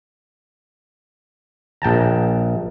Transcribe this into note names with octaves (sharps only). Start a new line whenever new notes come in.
A#1 G5 A5 A#5